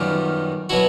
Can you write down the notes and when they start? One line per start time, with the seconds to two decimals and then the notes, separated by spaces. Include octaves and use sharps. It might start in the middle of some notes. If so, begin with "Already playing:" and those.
Already playing: F#2 D#3 G3 B3 F4 G4
0.69 B2 F#3 B3 E4 F#4